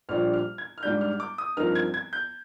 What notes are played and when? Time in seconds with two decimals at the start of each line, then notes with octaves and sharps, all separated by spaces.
0.09 A#1 A#2 G3 D4 F6
0.34 F6
0.58 G#6
0.78 F6
0.83 G#2 G3 D4 G6
1.01 F6
1.20 D6
1.38 D#6
1.57 G2 F3 C4 D#4 A#4 F6
1.75 G#6
1.94 G#6
2.13 G6